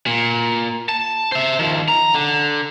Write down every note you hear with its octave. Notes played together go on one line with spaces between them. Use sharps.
A#2
A5
C5 E5
D#3 F3
A#5
D3